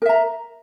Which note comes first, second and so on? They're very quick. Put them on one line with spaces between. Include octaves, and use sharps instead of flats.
A#4 E5 A#5